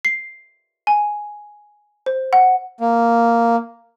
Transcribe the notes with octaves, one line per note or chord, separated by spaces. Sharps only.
C7
G#5
C5
F#5
A#3